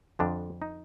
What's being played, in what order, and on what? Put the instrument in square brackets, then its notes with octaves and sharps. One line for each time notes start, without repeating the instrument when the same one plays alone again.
[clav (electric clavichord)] F2 D3 F3 D4
D#4